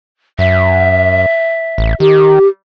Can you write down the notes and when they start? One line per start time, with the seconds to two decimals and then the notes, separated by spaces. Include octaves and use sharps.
0.39 F#2 E5
1.78 A1
2.00 D#3 G4